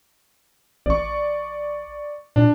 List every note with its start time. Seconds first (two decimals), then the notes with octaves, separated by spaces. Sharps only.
0.86 A1 D5 C#6
2.36 A#2 D4